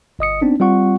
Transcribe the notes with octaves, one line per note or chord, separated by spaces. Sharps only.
G1 D#5 D#6 C#7
B3 C4 D4 D#4
G3 C4 F4 F#5 C#6